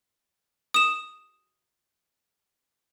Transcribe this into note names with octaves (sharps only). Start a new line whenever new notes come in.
D#6 E7